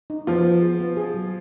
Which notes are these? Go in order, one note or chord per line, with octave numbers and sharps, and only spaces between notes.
D#4
F3 B3 F4
B3
G#4
B3
G#4
F#3